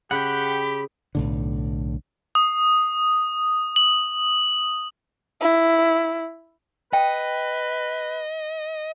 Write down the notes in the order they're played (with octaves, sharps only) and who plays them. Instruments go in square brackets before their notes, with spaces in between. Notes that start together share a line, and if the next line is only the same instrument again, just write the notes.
[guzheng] C#3 [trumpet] G4 [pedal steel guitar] F#5 G5 [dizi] B5
[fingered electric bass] B1 A2 D3
[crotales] D#6
F#7
[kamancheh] E4
[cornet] B4 [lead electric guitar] D#5 [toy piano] G5